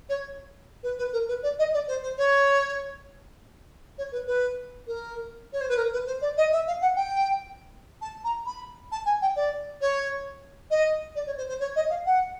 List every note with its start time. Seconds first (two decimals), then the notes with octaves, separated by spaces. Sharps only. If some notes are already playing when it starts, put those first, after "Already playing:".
0.09 C#5
0.83 B4
0.98 B4
1.13 A#4
1.28 B4
1.43 D5
1.59 D#5
1.74 D5
1.88 C5
2.02 C5
2.18 C#5
3.98 C#5
4.12 B4
4.27 B4
4.87 A#4
5.53 C#5
5.61 C5
5.69 B4
5.77 A#4
5.93 B4
6.07 C5
6.21 D5
6.37 D#5
6.52 E5
6.67 F5
6.81 F#5
6.96 G5
8.01 A5
8.24 A#5
8.46 B5
8.92 A5
9.05 G#5
9.22 G5
9.36 D5
9.81 C#5
10.70 D#5
11.15 D5
11.26 C#5
11.37 C5
11.48 C5
11.60 C#5
11.76 D#5
11.90 F5
12.06 F#5